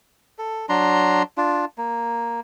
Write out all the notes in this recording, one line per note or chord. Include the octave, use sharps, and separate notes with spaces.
A4
F#3 D4 A#5 C6
D4 F4
A#3